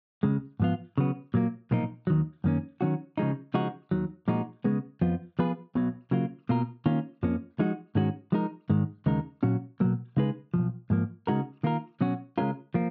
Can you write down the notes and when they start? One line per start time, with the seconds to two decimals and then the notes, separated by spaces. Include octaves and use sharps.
0.23 C#2 C#3 G#3
0.60 G#2 F3 B3 F4
0.98 C#3 F#3 B3
1.34 A#2 F#3 A#3
1.71 B1 A#2 F3 A#3 D#4
2.07 D#2 D#3 F#3
2.44 F#2 D#3 A#3 C#4
2.81 D#3 F#3 C#4 F#4
3.18 C#3 F3 G#3 D#4
3.54 C#3 F3 G#3 D#4 F#4
3.91 D#2 D#3 F#3
4.28 A#2 F3 G#3 D#4 F#4
4.64 C#3 G#3 B3
5.01 F2 F3 B3 F4
5.39 F3 B3 F4 G#4 B4
5.75 B1 B2 F#3
6.11 C#3 F#3 A#3 F4
6.49 B2 A#3 F4 A#4
6.86 D#3 A#3 C#4 F4
7.23 F2 F3 A#3 C#4
7.59 F3 G#3 D#4 F#4
7.95 G#2 D#3 G#3 C#4 F#4
8.32 F3 G#3 D#4 A#4
8.70 G#2 D#3 G#3
9.06 D#2 C#3 G#3 D#4 A#4
9.43 A#2 F#3 C#4 F#4
9.80 B2 F#3 A#3
10.17 C#3 G#3 D#4 G#4 B4
10.54 A#2 F3
10.58 B1
10.90 G#2 F3 A#3
11.27 C#3 G#3 D#4 F#4 A#4
11.63 D#3 A#3 F4 A#4
12.01 B2 F#3 C#4 F#4
12.38 C#3 G#3 C#4 F4 A#4
12.74 F3 A#3